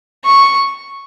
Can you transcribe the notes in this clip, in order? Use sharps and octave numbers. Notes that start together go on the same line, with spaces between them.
C#6